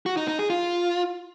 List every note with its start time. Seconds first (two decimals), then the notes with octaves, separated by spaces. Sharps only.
0.06 F#4
0.17 D#4
0.28 D#4
0.39 G#4
0.50 F4